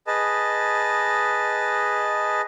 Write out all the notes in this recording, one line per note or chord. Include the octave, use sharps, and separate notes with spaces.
G#4 B4 D#5 A5